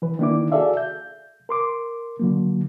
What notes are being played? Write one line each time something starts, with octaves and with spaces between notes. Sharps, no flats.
E3 B4
D#3 A#3 D4 E4 D6
F#4 G#4 A4 D5 E5 F5
G6
A#4 C6 D6
D3 F#3 A#3